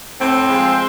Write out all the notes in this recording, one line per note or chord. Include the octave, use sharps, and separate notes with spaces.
A2 C4
F3 G#3